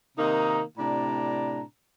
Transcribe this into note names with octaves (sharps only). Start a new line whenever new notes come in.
C3 D#3 A#3 D#4
A2 C3 D4 D5 A#5